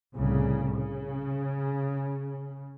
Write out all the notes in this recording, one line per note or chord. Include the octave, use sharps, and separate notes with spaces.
C2 A2 C#3
C#3